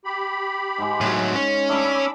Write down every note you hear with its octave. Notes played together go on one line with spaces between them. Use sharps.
G4 B5
G#2 G#3
A2 F#3
C#4
A3 D4 G#4 B5 D6 E6